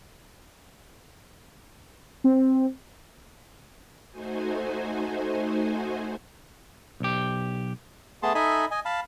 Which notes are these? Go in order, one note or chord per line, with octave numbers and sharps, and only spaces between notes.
C4
A3 D#4 F#4 C5 G#5
B1 G4
A3 B3 G#4 A5 C6
D#4 A4 D#5 E5 G#5 B5
D#5 G#5
F5 A5 B5